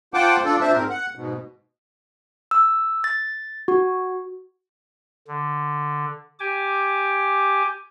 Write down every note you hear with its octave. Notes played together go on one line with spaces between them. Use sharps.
F4 C5 F#5 G5 A5 D6
D4 F4 A4 D5
A#2 C4 D4 C5 E5 A5
G#2 C4 A#4
F#5
G#2 B2
E6
A6
F#4
D3
G4 G#5 D6